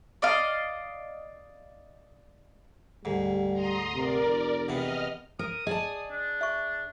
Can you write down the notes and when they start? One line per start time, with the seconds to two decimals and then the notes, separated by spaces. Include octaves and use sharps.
0.22 D5 D#5 F5
3.05 D2 G#2 G3
3.53 A#5 C6 D#6
3.94 C3 A#4 D5
4.24 F1
4.69 E2 C3 B3 D#5 F6
5.39 A#4 D#6
5.67 G#4 D5 D#5 A5
6.10 D4
6.41 E5 C#6